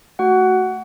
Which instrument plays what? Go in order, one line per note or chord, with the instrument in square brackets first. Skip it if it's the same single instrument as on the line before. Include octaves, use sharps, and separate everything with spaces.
[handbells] A3 F#4 F#5